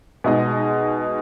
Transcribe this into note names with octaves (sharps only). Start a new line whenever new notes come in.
B2 G#3 D#4 G#4 D#5